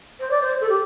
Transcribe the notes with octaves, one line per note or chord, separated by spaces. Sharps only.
C5
D5
C5
A4
G4